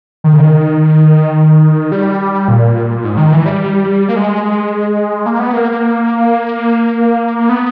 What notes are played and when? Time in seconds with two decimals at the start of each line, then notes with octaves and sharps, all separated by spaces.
0.24 D#3
0.33 C#3
0.40 D#3
1.92 G3
2.48 A#2
3.04 G#2
3.17 D#3
3.32 E3
3.46 G3
4.09 A#3
4.16 G#3
5.26 A#3
5.40 B3
5.53 A#3
7.49 B3